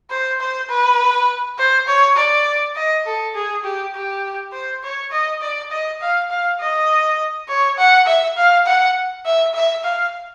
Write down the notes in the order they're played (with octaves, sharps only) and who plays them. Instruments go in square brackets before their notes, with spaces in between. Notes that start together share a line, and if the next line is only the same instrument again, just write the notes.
[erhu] C5
C5
B4
C5
C#5
D5
D#5
A4
G#4
G4
G4
C5
C#5
D#5
D5
D#5
F5
F5
D#5
C#5
F#5
E5
F5
F#5
E5
E5
F5